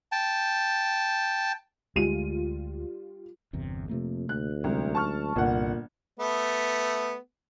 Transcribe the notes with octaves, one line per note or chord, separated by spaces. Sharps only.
G5 A5
D2 G3 G#3 F4 D#7
G1 E2 C3
F2 C3 A3 A#3
D2 F#6
C2 F#3 G#3 C#4
A5 C#6 F6
G1 C2 A#2 F#5
A3 B3